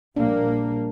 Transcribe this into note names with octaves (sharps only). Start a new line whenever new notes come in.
A#1 G3 A#3 D4